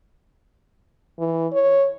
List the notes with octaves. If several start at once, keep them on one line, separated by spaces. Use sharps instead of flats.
E3
C#5